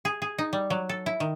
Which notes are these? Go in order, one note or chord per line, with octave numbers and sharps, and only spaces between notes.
G#4
G#4
D#4
G3
F#3
A4
E4
D#3